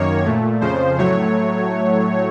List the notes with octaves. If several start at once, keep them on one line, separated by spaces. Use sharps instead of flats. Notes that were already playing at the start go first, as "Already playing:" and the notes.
Already playing: F#2 D#3 A#3 C#5
A#2 A3
F2 C#3 F3 C5
A2 F#3 A3 C#5